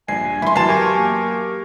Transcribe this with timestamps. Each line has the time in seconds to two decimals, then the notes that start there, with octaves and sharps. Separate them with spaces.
0.08 A#1 G2 G#5 C7
0.42 F#2 E4 C6
0.56 F#2 E3 F#3 B3 F5 A5 C7
0.69 G4 A#4 G#5 C#6
0.98 A#3